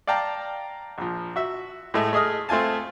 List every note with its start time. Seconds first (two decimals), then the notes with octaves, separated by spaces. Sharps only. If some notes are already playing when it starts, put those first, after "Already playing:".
0.07 D5 F5 G5 A5 A#5
0.98 A#1 F3
1.36 F#4 E5
1.94 A2 G#3 A3
2.13 A3 G#4 D#5 D#6 F6
2.49 A3 C4 F4 G#5 A5